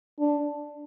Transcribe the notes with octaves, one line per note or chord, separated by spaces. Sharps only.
D4